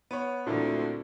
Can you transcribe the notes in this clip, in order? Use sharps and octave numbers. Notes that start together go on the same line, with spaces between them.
B3 C#5
D2 A#2 D3 A3 C4 D4 E4